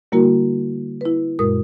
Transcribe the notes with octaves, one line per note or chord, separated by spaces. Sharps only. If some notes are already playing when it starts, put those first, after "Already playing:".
D3 G3 A#3 E4 F#4 A#4
E4 B4
F#2 A#2 G#3 A#4 D#6